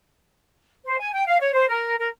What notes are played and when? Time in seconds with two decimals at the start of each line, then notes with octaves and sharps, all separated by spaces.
0.86 C5
0.99 G#5
1.13 G5
1.26 F5
1.40 C#5
1.53 C5
1.68 A#4
1.99 A#4